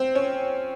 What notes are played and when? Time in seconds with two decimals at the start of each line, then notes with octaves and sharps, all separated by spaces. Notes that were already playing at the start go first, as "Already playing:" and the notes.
Already playing: C4
0.15 C#4